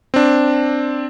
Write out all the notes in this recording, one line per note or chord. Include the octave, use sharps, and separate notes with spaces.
C4 D4